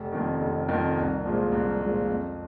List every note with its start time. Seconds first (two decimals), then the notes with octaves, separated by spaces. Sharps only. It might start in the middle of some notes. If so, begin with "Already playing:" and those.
Already playing: F1
0.12 F2 D#3
0.41 F1
0.69 F2 D#3
0.96 C2
1.24 A#2 F3 G#3
1.52 C2
1.80 A#2 F3 G#3
2.08 F2